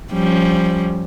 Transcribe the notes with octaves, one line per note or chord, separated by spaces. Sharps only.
F3 G3 C#4